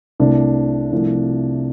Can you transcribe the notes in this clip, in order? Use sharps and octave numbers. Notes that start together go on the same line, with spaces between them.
C2 C3 A3 D4
C2 C3 F3 A3